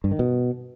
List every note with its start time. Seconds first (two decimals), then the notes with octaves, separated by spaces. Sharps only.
0.04 G2
0.12 D#3
0.19 B2